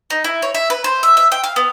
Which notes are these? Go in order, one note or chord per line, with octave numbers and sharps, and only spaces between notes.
D#4
E4
C#5
E5
B4
C5
E5
E5
G5
F5
B3